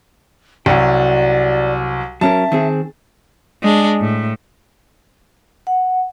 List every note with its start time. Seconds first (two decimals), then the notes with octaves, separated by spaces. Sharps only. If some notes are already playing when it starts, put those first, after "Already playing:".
0.66 C2 F#3 F#4 G4 D5
2.21 F#3 C#4 A#4 E5 A5
2.52 D#3 C4 G#4
3.62 G#3 D4
4.01 A2
5.67 F#5